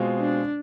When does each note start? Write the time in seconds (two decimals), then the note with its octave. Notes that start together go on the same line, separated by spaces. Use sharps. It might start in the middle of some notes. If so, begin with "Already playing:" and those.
Already playing: B2 G#3 C4 F4
0.19 D4